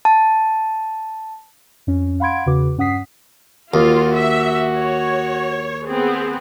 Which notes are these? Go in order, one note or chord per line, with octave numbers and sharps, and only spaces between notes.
A5
F2 C#4
F5 F#5 B5 C6 G#6 D7
E2 C#3 F#4 B4 D6
G2 C#4 F#5 D#6 B6 C7
D#2 F4 F#4
E5
C#5
B3 C4 G#4